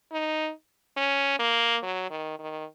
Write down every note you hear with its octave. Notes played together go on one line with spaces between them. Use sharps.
D#4
C#4
A#3
F#3
D#3
D#3